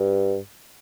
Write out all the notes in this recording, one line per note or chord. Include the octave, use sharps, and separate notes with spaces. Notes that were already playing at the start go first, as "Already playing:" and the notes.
Already playing: G2